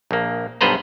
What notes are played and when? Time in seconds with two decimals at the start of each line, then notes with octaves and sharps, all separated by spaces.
0.11 A#1 A#3
0.61 B1 G2 B3 B4 C5 A#5